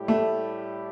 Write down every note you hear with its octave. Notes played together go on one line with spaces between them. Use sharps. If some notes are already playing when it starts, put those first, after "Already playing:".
Already playing: A2 G3 E4 G4
A3